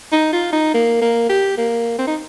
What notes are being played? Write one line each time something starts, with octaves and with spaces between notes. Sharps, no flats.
D#4
F4
D#4
A#3
A#3
G4
A#3
C4
D#4